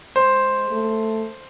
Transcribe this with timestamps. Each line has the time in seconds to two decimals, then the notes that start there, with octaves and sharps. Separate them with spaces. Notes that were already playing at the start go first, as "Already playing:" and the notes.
0.16 G#3 C5
0.70 A3